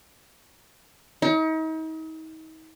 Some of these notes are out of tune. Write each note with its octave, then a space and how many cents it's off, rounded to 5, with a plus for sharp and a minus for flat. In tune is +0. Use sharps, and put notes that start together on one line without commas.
D#4 +40